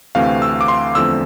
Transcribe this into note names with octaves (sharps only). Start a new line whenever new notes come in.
D2 C3 E3 A3 C4 F5
E6
D6
C6
E2 D3 F3 A3 C4 E6